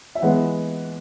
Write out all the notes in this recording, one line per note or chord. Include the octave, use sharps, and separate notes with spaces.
E5
E3 G#3 B3 F#5